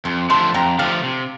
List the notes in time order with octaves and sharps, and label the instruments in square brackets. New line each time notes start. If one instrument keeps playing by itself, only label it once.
[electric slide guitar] F2 [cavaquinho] A5 C6
[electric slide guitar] D3 F3 A3 [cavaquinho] A5 C6
[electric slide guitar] F2 [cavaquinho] G5 A#5
[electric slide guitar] D3 F3 A3 [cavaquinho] F5 A5
[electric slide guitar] C3